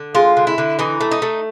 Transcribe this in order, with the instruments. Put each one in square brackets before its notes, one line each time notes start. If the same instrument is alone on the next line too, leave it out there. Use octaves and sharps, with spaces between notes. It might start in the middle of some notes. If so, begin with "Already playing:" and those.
Already playing: [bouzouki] D3
G#3 F4
D3
E4
D3
E3 D#4
A3
D#4
A3